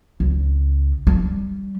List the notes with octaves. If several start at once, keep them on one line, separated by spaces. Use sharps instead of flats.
C#2
G3